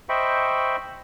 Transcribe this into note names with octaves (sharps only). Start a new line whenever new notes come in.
C5 D#5 E5 G5 B5 C#6